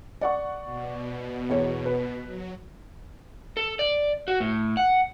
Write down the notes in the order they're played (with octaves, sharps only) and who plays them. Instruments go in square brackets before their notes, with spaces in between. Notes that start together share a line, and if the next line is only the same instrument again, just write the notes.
[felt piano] D5 F#5 C#6
[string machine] B2
[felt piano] E2 C#5
B4
[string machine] F#3
[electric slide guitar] A4
D5
F#4
A2
F#5